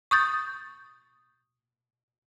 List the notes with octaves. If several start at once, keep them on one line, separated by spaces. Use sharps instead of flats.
C#6 D#6 G6 A6